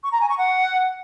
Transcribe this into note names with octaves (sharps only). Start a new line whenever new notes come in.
C#6
A#5
G#5
C#6
F#5